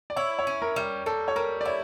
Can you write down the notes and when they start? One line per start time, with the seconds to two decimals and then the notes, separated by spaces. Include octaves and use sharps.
0.10 D5
0.16 E4 C#5
0.39 C#5
0.47 C#4
0.62 A#4
0.76 G3
1.06 G3 A4
1.28 C#5
1.36 G3 A#4
1.61 D5
1.65 E4 C#5